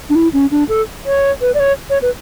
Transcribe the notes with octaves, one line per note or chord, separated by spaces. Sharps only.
D4
E4
C#4
D4
A4
C#5
B4
D5
C#5
C#5
B4